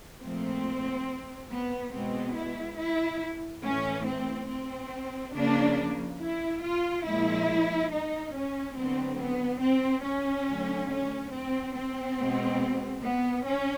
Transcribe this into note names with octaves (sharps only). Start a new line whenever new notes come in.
A#2 F3 A3 C4
B3
B2 G#3 B3 C4
E4
E4
A2 E3 A3 C#4
C4
C4
C#3 F3 A#3 D4
E4
F4
A#2 F3 G#3 E4
D#4
C#4
D3 F#3 B3 C4
B3
C4
C#4
D3 F#3 A3
C#4
C4
C4
B2 G#3 B3
B3
C#4